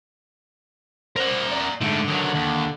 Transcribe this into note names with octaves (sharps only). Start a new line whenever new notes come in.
A#4 C5 D5 F#5
D5 A#5
G#2 D3 A3
D#3 F#3
D#2